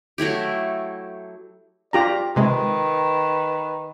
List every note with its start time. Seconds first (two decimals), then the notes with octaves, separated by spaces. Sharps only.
0.18 F#3 A3 E4 G4
1.93 F4 G4 D5 A#5
2.36 C3 D#3 G#3 B4